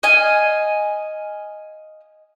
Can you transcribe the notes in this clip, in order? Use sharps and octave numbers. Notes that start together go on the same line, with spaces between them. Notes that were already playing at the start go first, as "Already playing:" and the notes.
D#5 F5 G#5